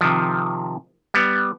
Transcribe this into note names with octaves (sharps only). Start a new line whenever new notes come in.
C3 D#3 F3
G3 B3